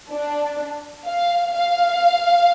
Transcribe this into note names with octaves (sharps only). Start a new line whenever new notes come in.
D4
F5
F5